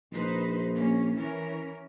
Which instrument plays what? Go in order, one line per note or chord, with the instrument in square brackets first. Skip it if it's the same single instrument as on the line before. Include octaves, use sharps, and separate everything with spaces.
[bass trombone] A#1 [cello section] D#4 B4 C5
[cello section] A#3 C#4
E3 C#4 A#4